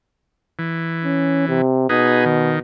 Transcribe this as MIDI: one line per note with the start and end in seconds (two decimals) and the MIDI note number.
0.59 1.61 52
1.04 1.44 61
1.48 1.85 48
1.89 2.61 47
1.89 2.25 63
1.89 2.25 68
1.89 2.25 71
2.26 2.59 51